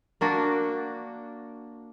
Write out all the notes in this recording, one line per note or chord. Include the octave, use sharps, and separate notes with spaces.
A#3 D4 F#4